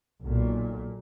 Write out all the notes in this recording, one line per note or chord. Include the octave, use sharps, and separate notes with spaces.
B1 A#2